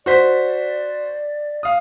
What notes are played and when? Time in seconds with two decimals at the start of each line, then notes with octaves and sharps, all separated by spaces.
0.06 F#4 C5 D5 B6
1.63 F5 D#6